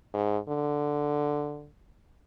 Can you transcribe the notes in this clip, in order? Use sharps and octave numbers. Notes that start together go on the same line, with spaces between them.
G#2
D3